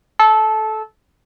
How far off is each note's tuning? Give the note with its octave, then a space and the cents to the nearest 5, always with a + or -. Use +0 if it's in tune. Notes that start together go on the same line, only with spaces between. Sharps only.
A4 -15